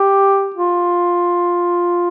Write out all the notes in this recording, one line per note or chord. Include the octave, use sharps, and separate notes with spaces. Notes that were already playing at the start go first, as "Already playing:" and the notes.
Already playing: G4
F4